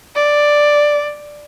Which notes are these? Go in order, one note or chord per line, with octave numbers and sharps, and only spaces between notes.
D5